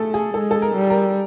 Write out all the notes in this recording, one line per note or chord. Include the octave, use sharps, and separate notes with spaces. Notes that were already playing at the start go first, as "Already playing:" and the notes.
Already playing: A3 G#4 A4
G#4
G#3 A4
A4
A#4
G3
A#4